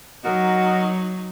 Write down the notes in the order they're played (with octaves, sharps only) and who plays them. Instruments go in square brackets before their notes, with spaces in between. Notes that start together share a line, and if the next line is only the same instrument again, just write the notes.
[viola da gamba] F#3 D#4 [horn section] F#4 A#4 D#5